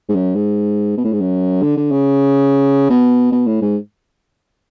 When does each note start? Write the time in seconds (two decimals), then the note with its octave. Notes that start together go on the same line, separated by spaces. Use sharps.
0.09 G#2
0.15 F#2
0.35 G#2
0.98 B2
1.04 A2
1.12 G#2
1.21 F#2
1.63 D3
1.77 D3
1.91 C#3
2.90 B2
3.32 B2
3.47 A2
3.62 G#2